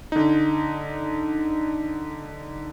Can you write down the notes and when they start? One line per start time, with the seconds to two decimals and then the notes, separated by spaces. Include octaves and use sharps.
0.12 D3 D#4